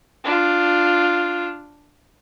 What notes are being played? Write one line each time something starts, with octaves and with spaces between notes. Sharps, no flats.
D4 F4